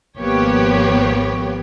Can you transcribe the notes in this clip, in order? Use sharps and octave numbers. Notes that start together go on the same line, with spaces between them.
G#1 F3 A#3 B3 G4 C#5